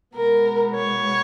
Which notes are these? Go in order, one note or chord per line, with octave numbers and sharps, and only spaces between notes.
B2 G#3 B3 A#4
C#5